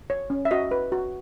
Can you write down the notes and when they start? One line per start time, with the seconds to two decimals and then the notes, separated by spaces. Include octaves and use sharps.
0.10 C#5
0.30 C#4
0.45 E5
0.51 F#4 D#5
0.71 B4
0.92 F#4